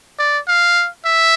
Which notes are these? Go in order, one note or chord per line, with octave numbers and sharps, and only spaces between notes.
D5
F5
E5